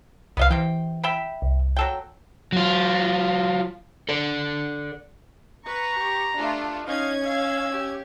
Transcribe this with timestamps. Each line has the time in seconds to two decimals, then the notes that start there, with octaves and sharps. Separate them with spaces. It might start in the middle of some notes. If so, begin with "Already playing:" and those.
0.37 C2 B3 D#5 F5
0.51 C3 E3 G5
1.03 E5 G5 B5
1.42 C2
1.76 F#3 A4 G5
2.52 F#3 F4
4.09 A4 D5
5.66 B4 A#5 C#6
5.99 G4
6.37 A3 D4 F4
6.87 C#4 D#4 F5 G#6
7.24 F5 E6
7.72 G4